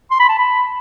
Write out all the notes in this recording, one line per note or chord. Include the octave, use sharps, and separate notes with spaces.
C6
B5
A5
B5